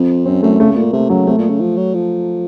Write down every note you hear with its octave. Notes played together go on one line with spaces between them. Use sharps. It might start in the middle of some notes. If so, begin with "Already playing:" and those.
Already playing: F2 C4
F#2 C4
F#2 A3
C#3 A3
A3
A#2
A#3
C3 A3
C#3 F#3
C3 A3
A#2
C#3
F3
F#3
F3